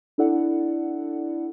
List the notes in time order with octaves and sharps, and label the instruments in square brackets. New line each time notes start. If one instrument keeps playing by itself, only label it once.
[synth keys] D4 E4 A4 D5 F#5